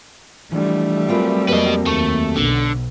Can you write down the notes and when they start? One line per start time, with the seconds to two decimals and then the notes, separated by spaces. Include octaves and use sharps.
0.52 E3 F3 G3 A3 D4
1.08 F#3 C4 F4 G4 A#4 B4
1.49 F2 A#3 B4 D#5
1.87 D#2 A3
2.36 B1 D3